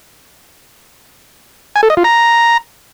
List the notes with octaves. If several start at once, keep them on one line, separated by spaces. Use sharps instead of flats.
G#5
A4
D#5
F4
A#5